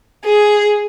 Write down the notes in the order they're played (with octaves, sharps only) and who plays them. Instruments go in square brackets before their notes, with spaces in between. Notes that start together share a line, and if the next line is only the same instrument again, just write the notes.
[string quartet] G#4